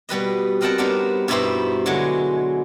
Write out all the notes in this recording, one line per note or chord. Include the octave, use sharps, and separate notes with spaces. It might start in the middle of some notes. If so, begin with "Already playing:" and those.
B2 G3 B4 D#5
C4 A#4 D#5 F#5 G5 A5
G3 B3 D4 D#4 A#4 C5
G2 B2 D#4 E4 G4 C5
D3 F#3 G#3